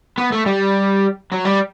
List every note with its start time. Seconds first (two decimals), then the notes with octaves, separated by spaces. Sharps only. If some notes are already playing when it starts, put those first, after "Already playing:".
0.18 B3
0.32 A3
0.46 G3
1.32 F#3
1.45 G3